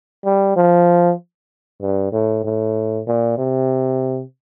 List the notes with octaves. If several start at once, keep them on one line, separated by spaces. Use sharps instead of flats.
G3
F3
G2
A2
A2
A#2
C3